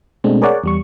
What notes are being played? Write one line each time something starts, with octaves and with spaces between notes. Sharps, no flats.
B2 G#3 A3 C4 D4
G#4 A#4 C#5 D5 F#5
E2 G3 C#6